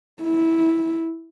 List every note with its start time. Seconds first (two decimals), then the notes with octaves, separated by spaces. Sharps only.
0.23 E4